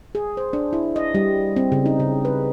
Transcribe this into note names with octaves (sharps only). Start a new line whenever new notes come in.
G#4
C5
D4
E4
D#5
G3
C4
C#3
D#4
C#3
B4